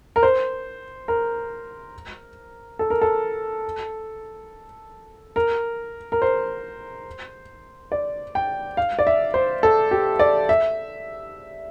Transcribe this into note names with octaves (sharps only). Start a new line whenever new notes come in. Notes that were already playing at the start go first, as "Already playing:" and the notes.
A#4
C5
A#4
A4
A#4
A4
A#4
A#4
C5
D5
G5
F5
D5
E5
C5
A4
G4
D5
E5